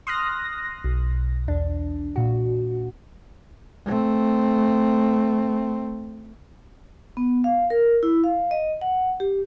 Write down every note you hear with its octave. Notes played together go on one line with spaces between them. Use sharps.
C6 D#6 F6 F#6 A#6
B1
E2 D4
A#2 F#4
A3 C4
B3
F5
A#4
E4
F5
D#5
F#5
G4